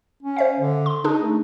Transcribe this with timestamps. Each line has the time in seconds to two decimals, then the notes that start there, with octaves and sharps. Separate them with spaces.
0.23 C#4
0.36 C5 E5 F5
0.60 D3
0.86 C6
1.04 D4 D#4 G#4
1.23 A3